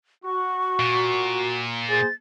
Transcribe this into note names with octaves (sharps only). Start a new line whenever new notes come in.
F#4 C#6
A#2
G#4 C5 A6